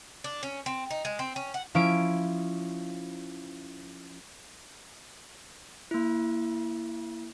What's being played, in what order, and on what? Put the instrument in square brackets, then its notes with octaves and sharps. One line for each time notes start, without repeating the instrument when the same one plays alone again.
[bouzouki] D4
C#4
C4
D#4
G#3
C4
C#4
F#5
[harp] F3 C#4 E4 D7
[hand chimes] A#3 E4